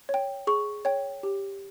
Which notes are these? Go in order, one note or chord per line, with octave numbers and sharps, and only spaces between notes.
C#5
G5
G#4 C#6
C#5 G5
G4